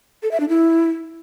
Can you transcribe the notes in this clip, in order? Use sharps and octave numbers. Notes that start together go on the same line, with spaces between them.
A4
E5
D4
E4